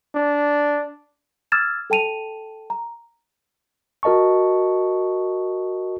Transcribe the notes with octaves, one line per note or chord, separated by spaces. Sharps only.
D4
D6 E6 F6 G#6 A6 E7
A4 G5 A5 D#7 F7
A#5
F#4 A#4 D#5 A5 C#6